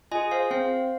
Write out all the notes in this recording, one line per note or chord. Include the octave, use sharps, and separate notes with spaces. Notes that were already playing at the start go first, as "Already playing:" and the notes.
F4 G#4 D#5 G#5
C5 F5
C4 C5 F5